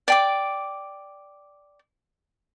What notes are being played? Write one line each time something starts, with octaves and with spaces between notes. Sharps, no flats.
D5 G5 D6